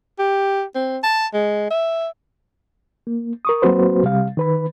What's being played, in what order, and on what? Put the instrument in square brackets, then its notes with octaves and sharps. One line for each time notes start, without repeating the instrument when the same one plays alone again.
[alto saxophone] G4
C4
A5
G#3
E5
[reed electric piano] A#3
A#4 C#6 D#6
F#3 A#3 C4 F#4 B4 C5
C3 G3 F5
D#3 B4 B5